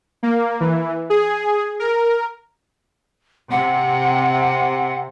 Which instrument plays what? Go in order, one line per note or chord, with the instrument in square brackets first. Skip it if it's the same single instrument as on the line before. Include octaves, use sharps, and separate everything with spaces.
[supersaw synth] A#3
E3
G#4
A#4
[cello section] C3 [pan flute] F#5